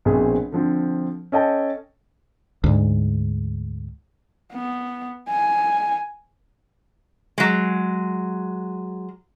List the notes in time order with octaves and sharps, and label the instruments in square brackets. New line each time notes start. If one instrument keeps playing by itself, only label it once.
[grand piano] A#1 B2 C4 G#4
D3 F3 C4
C#4 A4 D#5 G5 A5
[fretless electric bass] D2 G#2
[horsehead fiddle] B3
G#5
[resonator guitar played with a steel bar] F#3 G#3